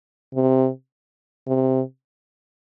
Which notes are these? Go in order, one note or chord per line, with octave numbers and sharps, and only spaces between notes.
C3
C3